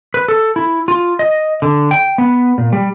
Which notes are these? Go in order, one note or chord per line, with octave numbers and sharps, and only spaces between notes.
B4
A4
E4
F4
D#5
D3
G5
B3
A#2
G3